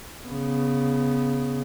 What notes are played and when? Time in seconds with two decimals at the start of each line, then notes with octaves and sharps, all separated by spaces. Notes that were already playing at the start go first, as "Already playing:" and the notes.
0.24 C#3 B3